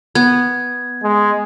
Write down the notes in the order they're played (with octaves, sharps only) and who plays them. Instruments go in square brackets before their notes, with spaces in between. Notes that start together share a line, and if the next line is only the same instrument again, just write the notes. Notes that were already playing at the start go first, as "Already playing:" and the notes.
[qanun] B3 [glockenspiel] G#6
[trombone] G#3